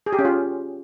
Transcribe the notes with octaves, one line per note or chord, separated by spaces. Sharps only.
G#4
G4
C#4
F4